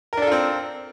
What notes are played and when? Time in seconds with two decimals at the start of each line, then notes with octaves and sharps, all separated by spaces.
0.13 A#4
0.17 D4
0.22 A4
0.27 F4
0.32 C4